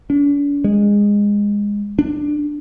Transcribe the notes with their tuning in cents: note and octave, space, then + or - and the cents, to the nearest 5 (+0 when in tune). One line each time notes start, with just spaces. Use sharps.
D4 -45
G#3 -20
D4 +10